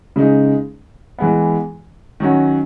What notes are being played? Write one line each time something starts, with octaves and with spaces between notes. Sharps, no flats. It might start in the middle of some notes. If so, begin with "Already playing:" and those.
C#3 G#3 D#4
E3 G#3 B3
D#3 F#3 C#4 F#4